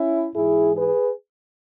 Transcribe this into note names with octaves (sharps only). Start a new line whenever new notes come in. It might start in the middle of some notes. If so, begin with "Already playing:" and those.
Already playing: C#4 E4
G#2 E3 E4 G#4
G#4 B4